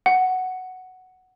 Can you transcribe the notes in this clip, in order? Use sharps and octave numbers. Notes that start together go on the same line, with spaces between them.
F#5